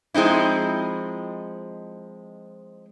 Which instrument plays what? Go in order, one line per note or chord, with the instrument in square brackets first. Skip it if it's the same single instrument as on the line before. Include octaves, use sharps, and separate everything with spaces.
[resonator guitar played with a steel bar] F3 G#3 C4 D#4 E4